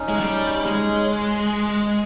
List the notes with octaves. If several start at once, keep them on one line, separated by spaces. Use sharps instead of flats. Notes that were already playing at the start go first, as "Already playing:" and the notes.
Already playing: C#4 D#4
G#3
G3
G#3